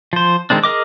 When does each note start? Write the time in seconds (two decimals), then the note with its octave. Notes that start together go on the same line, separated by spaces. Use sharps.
0.13 F3 C5
0.50 D#3 G#3 C4 D4
0.64 G#4 A#4 D#5 D6